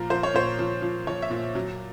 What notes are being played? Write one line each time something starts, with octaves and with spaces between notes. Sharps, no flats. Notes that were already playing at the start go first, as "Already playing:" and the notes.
Already playing: A#2 F3 A#4
F3 C5
C#5
A#2 C5
F3
F3
F3 C#5
E5
A#2
F#3